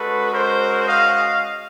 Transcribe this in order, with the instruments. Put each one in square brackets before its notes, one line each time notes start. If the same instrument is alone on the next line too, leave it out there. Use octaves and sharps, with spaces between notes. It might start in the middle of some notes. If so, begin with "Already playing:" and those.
Already playing: [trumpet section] G#3 C#4 F#4 A4 B4
A#4 C5
D#5 F5